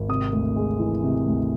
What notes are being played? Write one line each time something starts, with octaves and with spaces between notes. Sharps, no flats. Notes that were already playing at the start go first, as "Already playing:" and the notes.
Already playing: G#1
C3 D#6
D2
G#3
E3
C3
D2